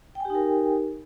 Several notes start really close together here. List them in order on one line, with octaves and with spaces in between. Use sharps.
G5 G#5 G4 D#4 A#4